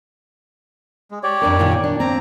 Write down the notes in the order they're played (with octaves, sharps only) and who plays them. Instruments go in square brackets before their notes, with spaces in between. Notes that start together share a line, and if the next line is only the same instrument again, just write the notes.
[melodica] G#3
G4 C#5 D5
[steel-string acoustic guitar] F2 D4 A#4
A#2 D#3 D#4
D4
[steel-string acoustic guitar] C4 [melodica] A#5